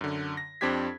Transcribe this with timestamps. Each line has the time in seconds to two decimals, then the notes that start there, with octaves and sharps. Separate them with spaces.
0.01 F#2 D3
0.37 A#6
0.61 F2 C4 D4 G4 G#6 B6